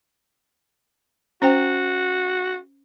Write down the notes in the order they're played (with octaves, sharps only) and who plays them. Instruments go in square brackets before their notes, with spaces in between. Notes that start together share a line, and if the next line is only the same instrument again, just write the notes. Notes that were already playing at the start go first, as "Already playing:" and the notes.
[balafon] C#4 C5 G5 [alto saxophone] F#4